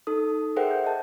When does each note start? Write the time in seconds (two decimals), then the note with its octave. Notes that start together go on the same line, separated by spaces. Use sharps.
0.07 D#4 A4 D#6
0.56 G#4 A#4 C5 E5 F#5 G5
0.71 G6
0.84 D#5 A5